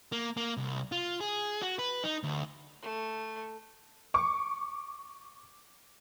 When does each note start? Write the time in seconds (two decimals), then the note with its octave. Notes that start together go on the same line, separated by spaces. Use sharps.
0.12 A#3
0.37 A#3
0.57 C2
0.92 F4
1.21 G#4
1.62 F#4
1.79 B4
2.04 D#4
2.23 D2
2.82 A3
4.14 C#6 D6